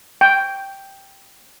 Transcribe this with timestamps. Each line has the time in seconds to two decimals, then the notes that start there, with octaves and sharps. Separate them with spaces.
0.21 G5